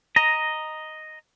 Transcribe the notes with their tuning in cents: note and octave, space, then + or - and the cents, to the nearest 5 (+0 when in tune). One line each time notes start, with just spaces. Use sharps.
D#5 +0 A#5 +0